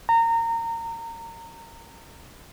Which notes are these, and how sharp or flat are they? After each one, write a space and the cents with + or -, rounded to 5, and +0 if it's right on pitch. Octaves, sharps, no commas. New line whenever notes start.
A#5 -25